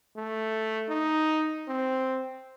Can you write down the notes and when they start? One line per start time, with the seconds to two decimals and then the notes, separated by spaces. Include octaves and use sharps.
0.17 A3
0.89 D#4
1.68 C4